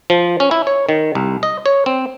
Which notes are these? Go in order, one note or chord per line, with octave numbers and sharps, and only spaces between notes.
F3
C#4
E4
C#5
D#3
C2
D#5
C#5
C4